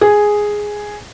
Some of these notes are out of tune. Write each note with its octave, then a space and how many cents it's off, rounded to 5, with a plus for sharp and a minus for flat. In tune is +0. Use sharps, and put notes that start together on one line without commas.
G#4 +0